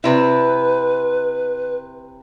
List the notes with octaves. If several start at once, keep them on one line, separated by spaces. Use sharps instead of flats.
C3 E4 B4